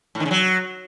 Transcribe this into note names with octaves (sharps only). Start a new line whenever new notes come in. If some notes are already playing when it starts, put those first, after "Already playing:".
A2
D#3
C#3
F#3